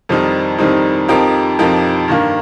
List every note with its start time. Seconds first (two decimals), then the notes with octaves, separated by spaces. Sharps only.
0.09 F2 D#3 G3 C4 D#4
0.58 F2 D#3 G3 C4 D#4
1.08 F2 F3 D#4 G4 A#4
1.59 F2 F3 D#4 G4 A#4
2.08 G2 D#3 A#3